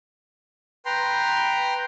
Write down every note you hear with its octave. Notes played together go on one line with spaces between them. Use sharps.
B4 G5 A#5 C6